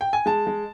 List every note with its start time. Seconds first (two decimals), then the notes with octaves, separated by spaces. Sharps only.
0.01 G5
0.13 G#5
0.26 G#3 A5
0.47 G#3